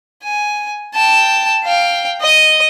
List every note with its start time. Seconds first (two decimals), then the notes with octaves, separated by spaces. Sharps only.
0.23 G#5
0.95 G5 A5
1.64 F5 G5
2.21 D#5 D#6